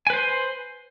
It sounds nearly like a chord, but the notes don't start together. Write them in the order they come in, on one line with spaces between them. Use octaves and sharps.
G#5 B4 C5 C6